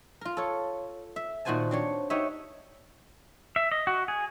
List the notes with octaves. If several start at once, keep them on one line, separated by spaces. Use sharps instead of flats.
F4 A#4
A4 C#5
E5
A#2 D#3 F#4 C5 G#5 A5
C4 D4 C#5
D#4 F#4 G4 C#5 E5
E5
D#5
F#4
G#4